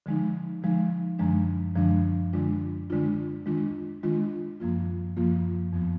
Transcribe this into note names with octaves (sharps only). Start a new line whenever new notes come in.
D3 F3 G#3 D#4
D3 F3 G#3 D#4
F#2 D3 F3 G#3 D4
F#2 D3 F3 G#3 D4
D3 G#3 D4 F4
D3 G#3 D4 F4
D#3 G#3 D4 F4
D#3 G#3 D4 F4
F#2 F3 A#3 F4
F#2 F3 A#3 F4
F2 F3 B3